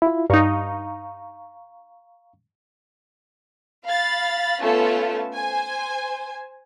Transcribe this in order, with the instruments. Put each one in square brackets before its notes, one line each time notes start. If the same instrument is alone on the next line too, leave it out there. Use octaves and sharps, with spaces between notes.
[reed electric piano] E4 F4
[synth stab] G2 D#4 [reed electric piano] F5 A#5 C#6
[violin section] F5 B5 A6
A3 B3 C#4 F4 A5
C5 G#5